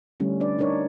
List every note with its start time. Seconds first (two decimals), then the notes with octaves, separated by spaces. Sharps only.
0.20 D3 G3 A3 C#4 E4
0.40 D4 B4 D5
0.59 D4 D#4 A#4 C#5 D5